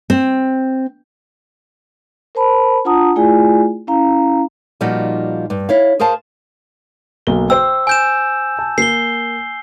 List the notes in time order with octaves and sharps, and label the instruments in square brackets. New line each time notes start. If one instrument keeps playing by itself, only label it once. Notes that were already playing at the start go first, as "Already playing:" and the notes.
[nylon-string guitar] C4
[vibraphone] A#4 C5 A5 B5
D4 F4 F#5 A5 A#5 D#6
A3 E4 F4 G#4 D5 G#5
C#4 E4 F5 A#5
[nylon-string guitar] A#2 F3 G3 D#4 F4 F#4
G2
E4 C#5 F5
G#4 A#4 C5 F5 A5
[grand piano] B1 A#3 G7
[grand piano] C5 G5 [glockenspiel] E6
[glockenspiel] G#5 G6 E7
[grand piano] A5
[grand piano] A#3 [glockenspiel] C7 G7